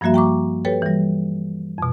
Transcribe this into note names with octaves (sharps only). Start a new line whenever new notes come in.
G2 F3 G3 A#3 F#4 E5
G5 A#5 C#6 D6
G4 A4 B4 C#5 G5
E3 G3
F2 B2